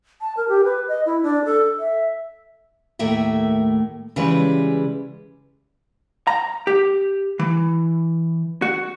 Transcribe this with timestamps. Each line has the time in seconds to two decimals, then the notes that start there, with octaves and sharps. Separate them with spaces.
0.21 A5
0.37 A#4
0.49 G4
0.64 B4
0.89 D#5
1.06 E4
1.23 D4
1.45 A4
1.79 E5
2.99 D#2 A2 A3 A#3 E5
4.16 C#3 E3 G3 G#3 B4
6.27 A#5
6.67 G4
7.39 E3
8.62 F#4